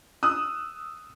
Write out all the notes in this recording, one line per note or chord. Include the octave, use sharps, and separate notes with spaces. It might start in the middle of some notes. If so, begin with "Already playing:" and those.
D#6 E6 F#6